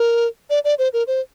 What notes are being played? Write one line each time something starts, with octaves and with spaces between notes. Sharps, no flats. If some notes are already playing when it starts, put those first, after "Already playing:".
Already playing: A#4
D5
D5
C5
A#4
C5